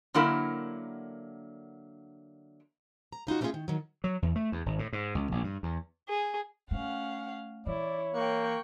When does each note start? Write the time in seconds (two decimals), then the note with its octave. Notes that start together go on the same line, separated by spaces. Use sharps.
0.14 D3 F#3 A#3 E4 A#4
3.12 A#5
3.27 C#3 D#4 F4 F#4
3.41 G3 A3 B3 C#4 F4 G#4
3.54 D#3
3.68 D#3 F#3
4.04 F#3
4.22 E2
4.36 A3
4.52 E2
4.66 G#1
4.79 A2
4.93 G#2
5.15 C#2
5.32 A#1
5.44 G2
5.63 E2
6.08 G#4
6.71 A3 C#4 F5 F#5
7.66 E3 E4 C#5 D5
8.15 A#3 G5 C#6 F#6